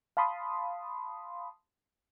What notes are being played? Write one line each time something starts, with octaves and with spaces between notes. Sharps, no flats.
F5 A5 B5 C6 D#6